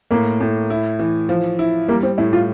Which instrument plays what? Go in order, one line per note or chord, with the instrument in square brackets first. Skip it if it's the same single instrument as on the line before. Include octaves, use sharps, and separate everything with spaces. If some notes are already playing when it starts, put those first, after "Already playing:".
[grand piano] A2 [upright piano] A#3
[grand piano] A2
E4
E3
F3
E4
[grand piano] G3 [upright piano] A#3
[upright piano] C4
[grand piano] A2 [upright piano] E4
[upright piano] F4